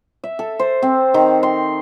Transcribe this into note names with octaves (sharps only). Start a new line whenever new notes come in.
E5
A4
C5
C4
D#3
C6